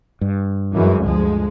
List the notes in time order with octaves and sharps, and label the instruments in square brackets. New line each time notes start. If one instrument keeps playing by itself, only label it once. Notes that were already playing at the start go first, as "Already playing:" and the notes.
[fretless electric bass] G2
[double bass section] F#2 E3 G#3
D2 F3 G#3